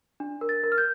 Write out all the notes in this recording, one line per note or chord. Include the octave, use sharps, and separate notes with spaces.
D4
A#4
A6
A#4
F6
G6